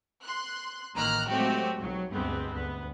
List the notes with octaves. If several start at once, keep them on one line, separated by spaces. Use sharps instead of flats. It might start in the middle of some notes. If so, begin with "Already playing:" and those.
C6 F#6
A1 D#3 A#3 A#5 F6 F#6
F#3 G#3 A3 C4 F#4 G4
B1 F#3
D2 G2 G#3 B3 C4
D2 B3